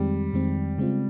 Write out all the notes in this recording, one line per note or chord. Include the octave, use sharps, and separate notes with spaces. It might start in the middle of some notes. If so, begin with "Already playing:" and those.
Already playing: F2 D#3 G3 G#3 C4
F2 D#3 G#3 C4
C#3 G#3 C4 F4